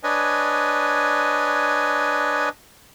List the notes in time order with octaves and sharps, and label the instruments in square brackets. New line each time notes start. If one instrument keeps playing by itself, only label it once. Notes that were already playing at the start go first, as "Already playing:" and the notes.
[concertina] D4 B4 C#5 D#5 G#5